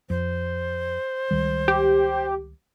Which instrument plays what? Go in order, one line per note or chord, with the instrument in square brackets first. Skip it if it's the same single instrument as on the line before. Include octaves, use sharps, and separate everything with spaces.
[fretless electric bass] F2 [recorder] C5
[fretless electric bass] C#2 D#3 G3
[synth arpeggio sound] G4